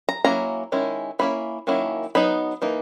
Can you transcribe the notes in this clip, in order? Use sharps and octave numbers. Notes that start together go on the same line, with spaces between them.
A#5
F#3 A#3 C#4 E4 A#5
D#3 G#3 C#4 E4
E3 A#3 C#4 E4 B5
D#3 F#3 A#3 C#4 E4
F#3 B3 D#4 B5
E3 A#3 D#4